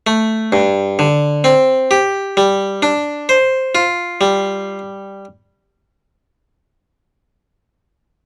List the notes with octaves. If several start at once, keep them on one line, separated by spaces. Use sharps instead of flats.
A3
G2
D3
C4
G4
G3
D4
C5
F4
G3